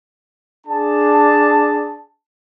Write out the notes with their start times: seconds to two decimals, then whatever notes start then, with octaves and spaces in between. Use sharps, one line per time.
0.67 D4 G#4 A5